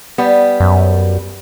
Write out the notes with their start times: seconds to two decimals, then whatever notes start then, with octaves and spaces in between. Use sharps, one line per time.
0.18 G3 B3
0.60 F#2